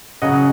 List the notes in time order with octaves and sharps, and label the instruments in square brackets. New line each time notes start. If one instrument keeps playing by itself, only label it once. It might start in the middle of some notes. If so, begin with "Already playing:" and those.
[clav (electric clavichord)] C#3 F#3 D#5 F#5